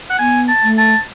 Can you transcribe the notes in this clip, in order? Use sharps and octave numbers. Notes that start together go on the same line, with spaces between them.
F#5
B3 G#5
A5
A3
A5